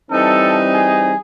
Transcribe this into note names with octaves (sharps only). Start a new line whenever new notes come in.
E3 G3 C4 D#4 A4
G#4